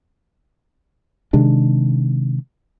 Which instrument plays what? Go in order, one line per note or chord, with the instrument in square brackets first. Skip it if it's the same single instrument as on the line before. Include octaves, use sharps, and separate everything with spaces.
[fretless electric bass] C3 D#3 G#3 D4